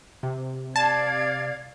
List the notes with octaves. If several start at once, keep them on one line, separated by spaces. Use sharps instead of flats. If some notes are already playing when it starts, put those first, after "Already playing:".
C3
D5 F5 A5 G#6